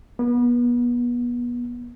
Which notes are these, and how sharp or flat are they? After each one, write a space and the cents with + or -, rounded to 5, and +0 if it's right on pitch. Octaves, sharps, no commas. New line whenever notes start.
B3 -30